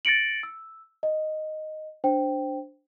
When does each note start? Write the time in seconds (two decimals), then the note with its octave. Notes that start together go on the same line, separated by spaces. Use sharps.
0.05 A6 A#6 C#7 D7 F#7
0.43 E6
1.03 D#5
2.04 D4 C5 G5